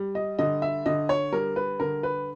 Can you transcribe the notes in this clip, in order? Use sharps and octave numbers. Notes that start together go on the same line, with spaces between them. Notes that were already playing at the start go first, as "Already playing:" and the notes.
Already playing: G3
D#5
D3 D#5
E5
D3 D#5
C#5
G3 A#4
B4
D3 A#4
B4